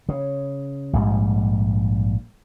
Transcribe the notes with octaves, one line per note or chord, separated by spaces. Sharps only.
C#3
A#1 G#2 G3